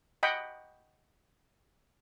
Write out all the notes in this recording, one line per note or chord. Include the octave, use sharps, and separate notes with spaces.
D#5 F#5 G5 B5